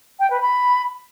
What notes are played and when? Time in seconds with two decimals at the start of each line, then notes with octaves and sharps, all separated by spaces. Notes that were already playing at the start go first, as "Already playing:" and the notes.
0.19 G5
0.30 B4
0.41 B5